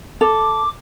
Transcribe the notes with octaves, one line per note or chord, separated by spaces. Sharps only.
A4 D6